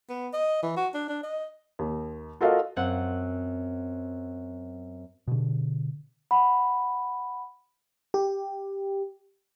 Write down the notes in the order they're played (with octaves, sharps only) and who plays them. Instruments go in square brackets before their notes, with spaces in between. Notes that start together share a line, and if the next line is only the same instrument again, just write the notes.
[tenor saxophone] B3
D#5
E3
F#4
D4
D4
D#5
[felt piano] D#2
F4 F#4 A4 A#4 D#5 F5
[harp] F#2 C4 F#5
[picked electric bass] B2 D3
[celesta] F#5 B5
[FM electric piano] G4